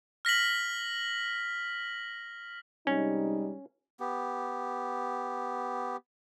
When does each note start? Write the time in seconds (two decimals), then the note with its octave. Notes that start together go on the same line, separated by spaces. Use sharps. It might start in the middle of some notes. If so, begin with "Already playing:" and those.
0.25 F6 A#6 B6 F#7
2.87 C3 G3 G#3 C#4 D#4
4.00 B3 G4